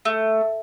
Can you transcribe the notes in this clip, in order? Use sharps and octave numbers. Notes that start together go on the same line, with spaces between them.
A3